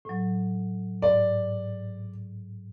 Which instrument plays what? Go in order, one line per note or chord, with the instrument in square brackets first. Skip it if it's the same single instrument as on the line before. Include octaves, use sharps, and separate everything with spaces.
[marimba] A2 F#3
[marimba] G#2 [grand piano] D5